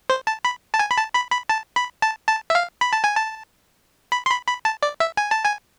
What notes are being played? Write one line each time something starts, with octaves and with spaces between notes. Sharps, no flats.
C5
A5
B5
A5
G#5
B5
A5
B5
B5
A5
B5
A5
A5
E5
F5
B5
A5
G#5
A5
B5
C6
B5
B5
A5
D5
E5
G#5
A5
G#5